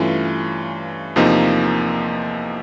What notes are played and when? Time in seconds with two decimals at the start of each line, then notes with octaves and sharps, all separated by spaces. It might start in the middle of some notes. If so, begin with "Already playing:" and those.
Already playing: G2 E3 A3 C#4 F4
1.16 E2 C3 F3 A#3 D#4